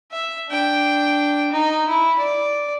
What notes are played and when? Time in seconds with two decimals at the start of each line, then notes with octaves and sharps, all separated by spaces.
0.12 E5
0.49 D4 G5
1.52 D#4
1.89 E4
2.18 D5